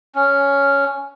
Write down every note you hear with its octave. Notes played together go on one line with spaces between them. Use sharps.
C#4